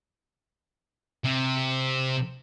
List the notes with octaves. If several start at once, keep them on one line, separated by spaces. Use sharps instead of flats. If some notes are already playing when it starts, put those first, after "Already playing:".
C3